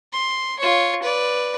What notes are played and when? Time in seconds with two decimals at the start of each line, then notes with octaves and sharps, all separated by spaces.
0.13 C6
0.59 F4 C#5
1.03 B4 D5